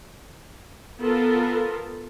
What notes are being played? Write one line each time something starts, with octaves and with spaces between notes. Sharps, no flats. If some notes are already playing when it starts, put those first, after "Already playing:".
B3 F4 A4 A#4